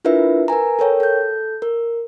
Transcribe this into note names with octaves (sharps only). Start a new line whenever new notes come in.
D4 E4 F4 A#4 B4 E5
A#4 B4 G#5 A#5
A4 A#4 C#5 G5
A4 G6
A#4